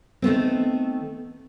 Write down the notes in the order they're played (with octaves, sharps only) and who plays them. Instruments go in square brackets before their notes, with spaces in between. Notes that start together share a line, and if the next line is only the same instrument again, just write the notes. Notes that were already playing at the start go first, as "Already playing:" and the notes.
[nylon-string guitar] D#3 A3 B3 C4